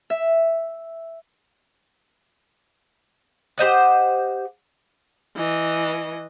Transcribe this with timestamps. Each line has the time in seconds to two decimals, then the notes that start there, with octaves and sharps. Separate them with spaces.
0.10 E5
3.58 G4 C5 D#5 F#5
5.36 E3 D#5